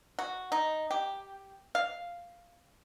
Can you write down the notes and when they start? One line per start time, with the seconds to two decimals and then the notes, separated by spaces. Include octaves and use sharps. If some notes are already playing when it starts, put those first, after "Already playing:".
0.19 F#4
0.52 D#4
0.91 G4
1.75 F5